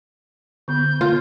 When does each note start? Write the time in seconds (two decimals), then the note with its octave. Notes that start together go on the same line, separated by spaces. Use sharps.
0.68 D3 B3 G6
1.01 F4